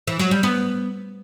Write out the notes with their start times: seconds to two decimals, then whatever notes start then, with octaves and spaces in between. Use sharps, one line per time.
0.07 E3
0.19 F#3
0.31 G3
0.43 B3